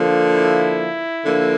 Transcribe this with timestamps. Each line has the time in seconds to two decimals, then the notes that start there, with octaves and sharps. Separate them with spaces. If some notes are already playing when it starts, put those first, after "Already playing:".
Already playing: D3 F3 A#3
0.35 E4
1.25 D3 F3 A#3